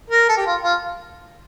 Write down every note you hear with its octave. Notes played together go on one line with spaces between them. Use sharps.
A#4
A4
G4
F4
F4